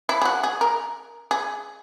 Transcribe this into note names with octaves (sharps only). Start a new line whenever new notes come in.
E4
G#4
F#4
G#4
A#4
G#4